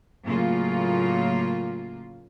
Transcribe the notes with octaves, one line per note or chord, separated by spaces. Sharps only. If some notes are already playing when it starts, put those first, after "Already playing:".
A2 C#3 F#3 A#3 F4